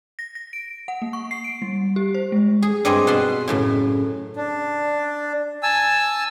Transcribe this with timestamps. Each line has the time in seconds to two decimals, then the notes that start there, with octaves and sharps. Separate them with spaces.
0.19 A#6
0.35 A#6
0.53 D7
0.88 F#5
1.02 A#3
1.13 C#6
1.31 C7
1.44 D7
1.62 G3
1.96 G4
2.15 C5
2.32 G#3
2.62 G#4
2.85 G2 G3 C4 G#4 D#5 G#5
3.07 B2 F#5 A5 C6
3.48 F#2 A2 C#3
4.36 D4
5.63 G#5 A5 E6